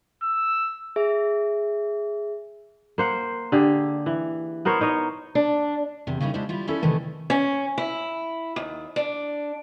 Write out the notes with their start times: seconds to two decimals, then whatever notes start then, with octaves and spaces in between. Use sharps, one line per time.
0.23 E6
0.96 G#4 E5
2.98 A#3 C5 F#5
3.52 D3 G4 G#4
4.06 E3
4.65 B3 A#4 C5 C#5
4.81 D#4 C#5 D#5
5.35 D4
6.07 E2 C3
6.20 C#3 G3 A#3 D#4 E4
6.34 G3 G#3 D4 E4 C5
6.49 G3 E4 F4
6.67 C#4 D#4 E4 G#4 A4 D5
6.82 C3 D#3 E3 A3
7.30 C#4
7.78 E4
8.56 D#2
8.96 D4